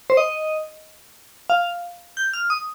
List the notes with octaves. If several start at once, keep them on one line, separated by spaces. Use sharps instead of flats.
C5
D#5
F5
G6
F6
D#6